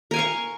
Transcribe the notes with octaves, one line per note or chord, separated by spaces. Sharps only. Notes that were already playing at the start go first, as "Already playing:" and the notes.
A#4 F5 G#5 C#6